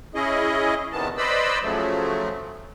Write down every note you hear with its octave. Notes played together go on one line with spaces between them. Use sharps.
C#4 E4 G#4 D#5
E2 C3 D#3 B3 A5
B4 C5 D5 D#5 B5 E6
C#3 F3 F#3 A3